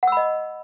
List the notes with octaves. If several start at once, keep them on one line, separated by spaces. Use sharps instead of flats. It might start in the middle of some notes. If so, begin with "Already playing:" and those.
D#5 F#5 B5 E6